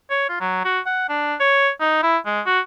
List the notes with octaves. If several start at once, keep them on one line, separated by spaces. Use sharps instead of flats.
C#5
F4
F#3
F#4
F#5
D4
C#5
D#4
E4
G#3
F#4